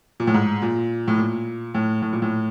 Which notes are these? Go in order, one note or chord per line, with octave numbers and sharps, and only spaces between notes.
A#2
A2
G#2
A#2
A2
A#2
A2
A2
A#2
A2